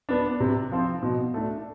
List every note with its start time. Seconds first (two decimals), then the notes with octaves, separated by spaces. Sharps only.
0.09 B3 D4
0.40 C3
0.72 F3 C4
1.03 B2
1.34 A3 D4